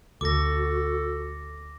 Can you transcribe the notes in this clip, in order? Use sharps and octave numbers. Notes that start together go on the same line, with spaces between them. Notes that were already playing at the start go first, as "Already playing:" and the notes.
D2 F#4 A4 D6 A#6